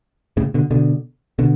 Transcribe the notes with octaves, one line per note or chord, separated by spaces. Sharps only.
A2 C#3
B2 D3
B2 D3
B2 D3